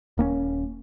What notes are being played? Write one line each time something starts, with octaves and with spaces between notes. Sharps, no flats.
D#1 A#3 B3 C#4